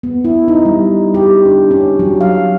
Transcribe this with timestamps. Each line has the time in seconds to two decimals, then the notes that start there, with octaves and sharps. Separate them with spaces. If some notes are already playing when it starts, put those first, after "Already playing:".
0.03 B3
0.25 E4
0.48 D#4
0.65 G3
1.14 G4
1.45 D4
1.71 C#4
1.99 F#3
2.21 F5